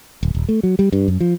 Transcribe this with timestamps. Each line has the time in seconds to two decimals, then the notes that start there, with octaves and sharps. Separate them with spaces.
0.23 D1
0.35 D#1
0.49 A3
0.63 F#3
0.79 G3
0.92 G2
1.08 F#2
1.20 F3